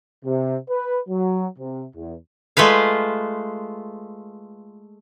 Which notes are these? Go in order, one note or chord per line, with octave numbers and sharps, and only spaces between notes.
C3
B4
F#3
C3
E2
G#3 A3 F4 B4 F5